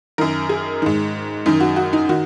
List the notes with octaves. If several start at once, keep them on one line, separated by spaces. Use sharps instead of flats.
F#2 D#3 A#4
G#4
G#2 D#3
F#2 D#3 D#4
F#4
F#4
D#4
D#3 F#4